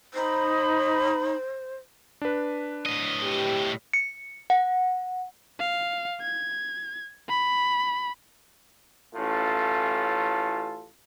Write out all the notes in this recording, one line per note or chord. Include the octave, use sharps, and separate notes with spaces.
D#4 C5 B5
D4 B4
A2 D#5
G4
C#7
F#5
F5
G#6
B5
A1 A2 C#4 F4 A4